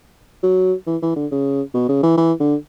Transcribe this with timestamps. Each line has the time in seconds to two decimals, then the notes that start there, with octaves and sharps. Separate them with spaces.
0.43 F#3
0.87 E3
1.02 E3
1.16 D3
1.31 C#3
1.74 B2
1.89 C#3
2.03 E3
2.17 E3
2.40 D3